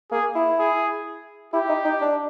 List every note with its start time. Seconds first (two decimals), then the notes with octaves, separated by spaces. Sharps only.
0.11 A#3 G#4
0.35 E4
0.59 G#4
1.53 E4 G4
1.69 D#4
1.85 D#4
2.01 D4